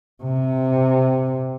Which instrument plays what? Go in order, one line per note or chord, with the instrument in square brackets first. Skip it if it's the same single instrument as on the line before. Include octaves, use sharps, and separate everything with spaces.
[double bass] C3